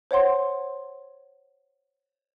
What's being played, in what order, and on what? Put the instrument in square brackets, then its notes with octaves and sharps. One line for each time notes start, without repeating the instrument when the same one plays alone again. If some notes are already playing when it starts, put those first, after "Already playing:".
[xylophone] C5 C#5 F#5 C6